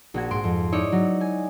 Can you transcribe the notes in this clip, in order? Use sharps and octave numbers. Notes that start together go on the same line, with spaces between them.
A#1 F#4 G#6
G#2 C6 D7
F2
D#4 E4 C#5 D5 E5
F#3
G#5